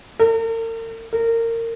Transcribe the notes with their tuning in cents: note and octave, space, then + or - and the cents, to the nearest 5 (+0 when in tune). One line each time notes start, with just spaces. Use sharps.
A#4 -45
A#4 -25